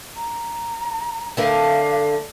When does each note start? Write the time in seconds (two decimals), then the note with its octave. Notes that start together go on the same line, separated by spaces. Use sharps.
0.16 A#5
1.37 D3 A3 A#4 F5